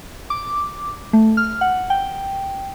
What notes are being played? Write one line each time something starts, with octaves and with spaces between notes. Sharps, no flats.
D6
A3
F6
F#5
G5